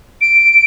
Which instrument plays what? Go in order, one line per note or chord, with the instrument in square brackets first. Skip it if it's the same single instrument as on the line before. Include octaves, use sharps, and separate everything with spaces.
[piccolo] D7